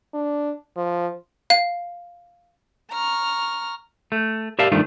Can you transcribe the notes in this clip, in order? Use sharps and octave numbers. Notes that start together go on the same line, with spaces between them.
D4
F3
F5
A#5 C#6 F6
A3
G4 A#4 D5 E5 F5 A5
G2 D#3 F3 A3 D4